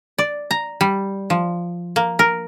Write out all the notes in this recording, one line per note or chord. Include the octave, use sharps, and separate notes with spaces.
D5
A#5
G3
F3
A#3
A#4